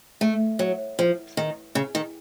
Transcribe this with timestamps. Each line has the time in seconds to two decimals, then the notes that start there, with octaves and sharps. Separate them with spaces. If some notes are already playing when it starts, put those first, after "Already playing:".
0.21 A3
0.59 F#3
0.99 F3
1.37 D#3
1.75 C#3
1.95 D#3